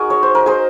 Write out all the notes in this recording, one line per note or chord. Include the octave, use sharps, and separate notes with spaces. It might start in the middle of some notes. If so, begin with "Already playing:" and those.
Already playing: D#4 F#4 G#4 A#4
C#5
C5
A#4
G#4 C5